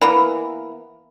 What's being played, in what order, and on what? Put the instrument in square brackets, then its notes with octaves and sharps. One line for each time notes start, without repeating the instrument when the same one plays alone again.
[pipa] E3 A#3 B3 [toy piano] B5